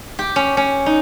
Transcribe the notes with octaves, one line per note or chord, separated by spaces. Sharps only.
G4
C#4
C#4
D#4